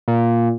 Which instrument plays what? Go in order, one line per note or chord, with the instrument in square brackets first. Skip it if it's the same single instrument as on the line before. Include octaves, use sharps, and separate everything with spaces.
[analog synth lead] A#2